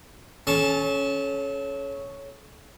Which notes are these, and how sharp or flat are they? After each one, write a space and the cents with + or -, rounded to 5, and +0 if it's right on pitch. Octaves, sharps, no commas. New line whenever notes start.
C#4 +0 A4 -40 A5 -5